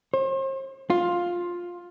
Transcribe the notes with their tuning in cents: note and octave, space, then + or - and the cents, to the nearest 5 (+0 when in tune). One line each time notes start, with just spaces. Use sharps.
C5 +40
F4 +10